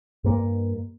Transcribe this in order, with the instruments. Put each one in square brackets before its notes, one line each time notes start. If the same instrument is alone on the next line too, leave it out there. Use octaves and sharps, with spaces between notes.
[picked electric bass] G2 A#3